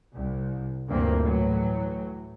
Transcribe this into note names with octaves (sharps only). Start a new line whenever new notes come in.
C2
D2 G2 A#2 E3 A#3 C4
A2 E3 F#3